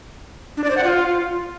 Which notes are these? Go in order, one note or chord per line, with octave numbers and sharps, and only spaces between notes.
D4
D5
C5
F#5
F4